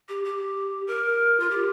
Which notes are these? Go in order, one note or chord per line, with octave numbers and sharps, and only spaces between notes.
G4
G4
A#4
F4
G4